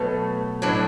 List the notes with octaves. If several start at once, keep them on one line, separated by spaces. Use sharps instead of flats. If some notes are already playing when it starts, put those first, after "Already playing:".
Already playing: B2 F#3 A3
A2 F#3 D4